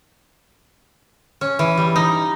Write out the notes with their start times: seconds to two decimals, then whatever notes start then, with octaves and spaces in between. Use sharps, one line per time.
1.41 C#4
1.59 E3
1.78 G3
1.96 D#4